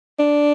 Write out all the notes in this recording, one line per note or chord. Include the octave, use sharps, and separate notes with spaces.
D4